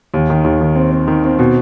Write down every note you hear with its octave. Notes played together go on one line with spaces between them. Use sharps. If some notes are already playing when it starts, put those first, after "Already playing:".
D#2
D#3
D#2
D#3
C4
C4
D#3
C4
B2